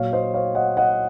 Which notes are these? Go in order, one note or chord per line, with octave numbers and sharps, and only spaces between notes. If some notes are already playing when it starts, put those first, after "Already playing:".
Already playing: A#2 F#3 C#5 F5
C5 D#5
C#5 F5
D#5 F#5
D#5 F#5